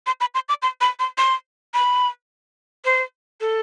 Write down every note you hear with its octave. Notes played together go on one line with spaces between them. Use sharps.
C6
B5
C6
D6
C6
B5
C6
C6
B5
C5
A4